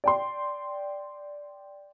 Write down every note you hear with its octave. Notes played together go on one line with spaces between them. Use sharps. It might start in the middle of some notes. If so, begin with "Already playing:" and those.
D5 G5 C6